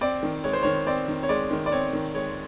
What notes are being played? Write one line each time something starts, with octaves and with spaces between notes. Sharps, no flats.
C4 D5
D#3
G#3 C#5
C5
D#3 C#5
C4 D5
D#3
C#5
G#3 D5
D#3
D5
C4 C#5
D#3
G#3 C#5